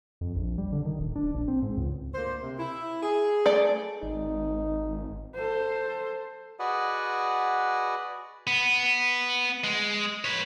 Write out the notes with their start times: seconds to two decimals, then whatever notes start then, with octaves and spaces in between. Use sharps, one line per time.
0.21 F2
0.36 A#1
0.58 G3
0.72 D3
0.85 D#3
0.99 D1
1.15 D4
1.35 A#1
1.48 C4
1.63 G#2
1.77 C#2
2.14 D2 A#3 C5
2.43 C3
2.58 E4
3.02 G#4
3.46 A3 D5
4.03 G#1 D#4
5.35 A4 C5
6.59 F#4 G#4 B4 D5 D#5 F#5
8.47 B3
9.64 G#3
10.24 B4 C#5